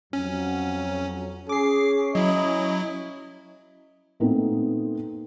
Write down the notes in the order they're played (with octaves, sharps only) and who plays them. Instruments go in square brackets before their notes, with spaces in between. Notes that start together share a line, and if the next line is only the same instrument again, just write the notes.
[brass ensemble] F2 F#3 [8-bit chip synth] C#4
[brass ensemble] C#4 [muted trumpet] G#4 [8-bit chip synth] D6 C7
[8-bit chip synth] F#3 E4 [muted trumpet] D#5
[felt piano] A#2 A3 B3 C4 D#4